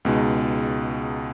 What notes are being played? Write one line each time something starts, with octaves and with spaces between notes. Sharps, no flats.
C#2 B2 G#3 D#4